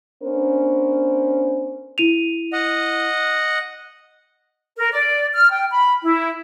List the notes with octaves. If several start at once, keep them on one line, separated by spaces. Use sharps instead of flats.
B3 C#4 D4 A#4 C5
E4 D#7 F7
D#5 F#5
A#4
D5
F6
G5
B5
E4